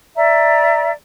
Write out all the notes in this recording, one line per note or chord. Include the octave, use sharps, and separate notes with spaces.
D5 E5 A#5